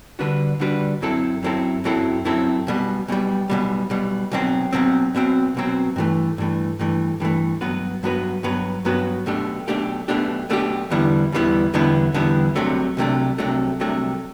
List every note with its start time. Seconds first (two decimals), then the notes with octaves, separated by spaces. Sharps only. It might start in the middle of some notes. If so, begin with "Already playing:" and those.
0.19 D3 G3 D4 F#4 B4
0.60 D3 G3 D4 F#4 B4
1.01 F#2 F#3 C4 E4 A4
1.43 F#2 F#3 C4 E4 A4
1.84 F#2 F#3 C4 E4 A4
2.25 F#2 F#3 C4 E4 A4
2.67 B1 B2 G3
3.08 B1 B2 G3
3.50 B1 B2 G3
3.90 B1 B2 G3
4.32 B1 B2 F#3 C4
4.73 B1 B2 F#3 C4
5.14 B1 B2 F#3 C4
5.55 B1 B2 F#3 C4
5.96 G2 E3 A3
6.38 G2 E3 A3
6.79 G2 E3 A3
7.20 G2 E3 A3
7.61 G2 F#3 B3 F#4 B4
8.03 G2 F#3 B3 F#4 B4
8.43 G2 F#3 B3 F#4 B4
8.85 G2 F#3 B3 F#4 B4
9.26 B1 B2 A3 D4 G4
9.68 B1 B2 A3 D4 G4
10.08 B1 B2 A3 D4 G4
10.50 B1 B2 A3 D4 G4
10.90 E2 D3 G3 B3 E4
11.32 E2 D3 G3 B3 E4
11.74 E2 D3 G3 B3 E4
12.14 E2 D3 G3 B3 E4
12.56 C2 C3 F#3 A3 D4
12.97 C2 C3 F#3 A3 D4
13.38 C2 C3 F#3 A3 D4
13.80 C2 C3 F#3 A3 D4